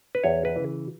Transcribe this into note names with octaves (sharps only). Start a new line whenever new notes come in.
B4
E2 C#5
B4
C#3 E3